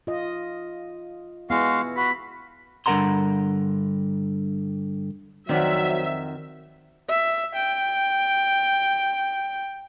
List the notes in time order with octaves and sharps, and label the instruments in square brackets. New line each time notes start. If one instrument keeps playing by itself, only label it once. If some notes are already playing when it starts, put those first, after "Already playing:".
[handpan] F4 D#5
[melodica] G#3 F5 [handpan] B3 E4 [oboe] F#4
[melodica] F#4 [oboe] B5
[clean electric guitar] G2 D3 A#4 F#5 A#5 C6
[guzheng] F2 D#3 [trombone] F#3 [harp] C4 D5 F#5 [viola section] E5
[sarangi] E5
G5